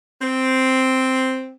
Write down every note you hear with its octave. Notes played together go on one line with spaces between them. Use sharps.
C4